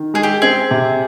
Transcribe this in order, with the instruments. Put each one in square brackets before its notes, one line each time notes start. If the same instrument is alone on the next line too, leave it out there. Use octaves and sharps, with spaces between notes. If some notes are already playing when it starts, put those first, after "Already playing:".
Already playing: [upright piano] D#3
[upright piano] G#3 [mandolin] G#4
[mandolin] G4
[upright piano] C4 [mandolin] G#4
[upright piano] C3